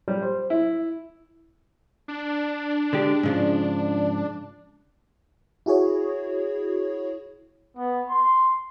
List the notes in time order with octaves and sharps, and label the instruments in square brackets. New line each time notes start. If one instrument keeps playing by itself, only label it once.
[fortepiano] G3
C5
E4
[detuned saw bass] D4
[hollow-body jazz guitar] D3 G#3 G4
G#2 C#3 F3
[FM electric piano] E4 F#4 G#4 C#5
[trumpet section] B3
C6